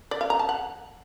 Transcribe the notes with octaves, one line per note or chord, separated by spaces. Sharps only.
D5
F5
A#5
A5
F#5